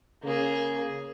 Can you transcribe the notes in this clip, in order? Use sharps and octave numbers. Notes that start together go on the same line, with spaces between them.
C#3 A#3 G#4